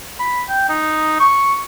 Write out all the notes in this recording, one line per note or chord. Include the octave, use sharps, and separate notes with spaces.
B5
G5
D#4
C#6